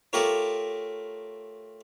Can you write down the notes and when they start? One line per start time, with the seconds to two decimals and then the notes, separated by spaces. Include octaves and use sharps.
0.13 A3 F4 G4 A#4 C#5